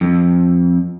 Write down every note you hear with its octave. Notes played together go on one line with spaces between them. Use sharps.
F2